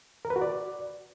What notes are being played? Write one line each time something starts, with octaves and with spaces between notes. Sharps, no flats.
A#4
B4
F#4
D5